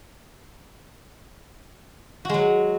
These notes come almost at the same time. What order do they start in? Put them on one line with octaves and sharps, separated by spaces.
F#4 G#3 F#3